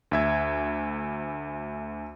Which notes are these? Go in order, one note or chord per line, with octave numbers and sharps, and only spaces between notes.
D2 E5 G#6